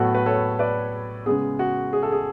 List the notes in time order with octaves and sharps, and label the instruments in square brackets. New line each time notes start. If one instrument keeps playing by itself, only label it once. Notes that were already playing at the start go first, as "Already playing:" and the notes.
Already playing: [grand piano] A2 F#3 B3 F#4 A4
B4
A4 C#5
B4 D5
C#3 G#3 B3 G#4
F#4
G#4
A4
G#4